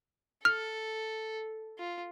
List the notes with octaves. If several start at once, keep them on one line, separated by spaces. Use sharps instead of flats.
A4 F6
F4